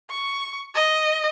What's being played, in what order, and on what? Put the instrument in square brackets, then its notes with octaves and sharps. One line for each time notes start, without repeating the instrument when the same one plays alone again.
[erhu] C#6
D#5